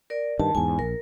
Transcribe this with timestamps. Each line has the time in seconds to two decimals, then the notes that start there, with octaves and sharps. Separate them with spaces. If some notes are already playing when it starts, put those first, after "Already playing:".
0.10 A#4 D5
0.39 G2 D#3 A5
0.55 E2 G#2 G#5
0.79 A#1 A#4